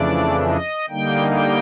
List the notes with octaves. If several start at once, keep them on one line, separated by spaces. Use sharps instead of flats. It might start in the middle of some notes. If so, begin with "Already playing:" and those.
Already playing: F2 C#3 E3 A3 D4 D5
D#5
D3 G3 A#3 D#4 G5
G5